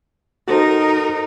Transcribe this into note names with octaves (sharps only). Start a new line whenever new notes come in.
D#4 F#4 A4 A#4 C5